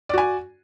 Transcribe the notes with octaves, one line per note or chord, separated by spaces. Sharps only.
F#4 D5 G#5